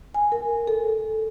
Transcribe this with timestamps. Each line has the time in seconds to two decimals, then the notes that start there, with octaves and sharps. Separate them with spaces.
0.14 G#5
0.32 A#4
0.67 A4